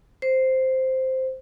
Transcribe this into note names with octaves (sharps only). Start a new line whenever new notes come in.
C5